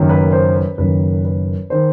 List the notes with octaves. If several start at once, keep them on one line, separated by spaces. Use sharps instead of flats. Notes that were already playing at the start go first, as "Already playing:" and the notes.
Already playing: F#1 F#2 D#3
B4
C5
B4
F#1 F#2 D#3 B4
B4
D#3 C5